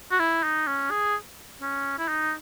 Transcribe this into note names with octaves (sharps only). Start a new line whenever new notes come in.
F#4
E4
D#4
C#4
G#4
C#4
E4
D#4